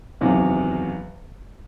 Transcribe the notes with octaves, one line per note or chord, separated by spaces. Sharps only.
F#1 E2 C3 D#3 F#3